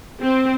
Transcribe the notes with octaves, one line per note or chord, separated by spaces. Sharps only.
C4